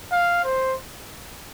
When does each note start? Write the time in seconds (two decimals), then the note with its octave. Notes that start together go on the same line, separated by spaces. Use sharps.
0.12 F5
0.44 C5